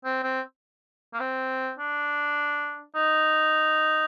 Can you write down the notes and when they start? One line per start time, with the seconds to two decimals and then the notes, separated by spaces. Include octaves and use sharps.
0.05 C4
0.23 C4
1.14 A#3
1.20 C4
1.79 D4
2.95 D#4